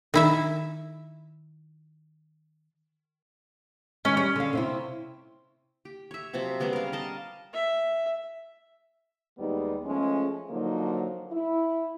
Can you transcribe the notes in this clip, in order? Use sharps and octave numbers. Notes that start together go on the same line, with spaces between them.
D#3 E4 E5
D#3 G#3 C#4
G3 C#4
D3 F5
C3 C4 E4
G4
C#5 E5
C3 F3 F#3 C4
G3 G#3 B3 C#4
A#4 F5
A#4 D#5 A5
E5
D#2 G3 G#3 B3 D#4
F3 G#3 A3 C#4
D3 F3 F#3 A#3 D#4
E4